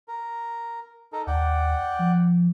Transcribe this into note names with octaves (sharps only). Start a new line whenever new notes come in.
A#4
D#4 A4 A#4
D#2 D5 F#5 G5
F3